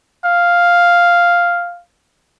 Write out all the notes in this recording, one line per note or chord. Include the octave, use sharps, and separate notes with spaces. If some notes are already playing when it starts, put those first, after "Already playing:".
F5